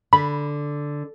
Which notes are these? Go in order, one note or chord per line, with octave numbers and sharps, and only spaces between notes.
D3 B5